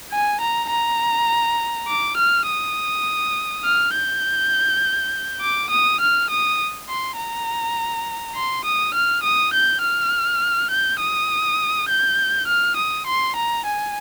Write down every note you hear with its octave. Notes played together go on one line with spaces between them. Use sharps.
G#5
A#5
A#5
D6
F6
D#6
F6
G6
D6
D#6
F6
D#6
C6
A#5
C6
D#6
F6
D#6
G6
F6
G6
D#6
G6
F6
D#6
C6
A#5
G#5